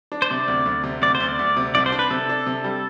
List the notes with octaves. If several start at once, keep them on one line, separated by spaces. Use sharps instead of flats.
D4
C5
C3 D5
D2
D2
C3
D2 D5
C5
D2
D5
D2
C3
C2 D5
C5
D4
B4
C3 A4
D4
C3
G3